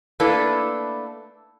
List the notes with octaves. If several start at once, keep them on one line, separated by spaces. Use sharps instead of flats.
A3 A#3 D4 E4 A4 B4